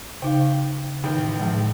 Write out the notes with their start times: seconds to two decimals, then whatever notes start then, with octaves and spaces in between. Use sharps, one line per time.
0.22 C#3 D#4 F5 G5
1.04 A1 D#3 G5
1.40 A2 F3 G#3